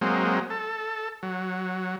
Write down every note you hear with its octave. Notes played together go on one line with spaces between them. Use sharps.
F#3 G#3 A#3 C4
A4
F#3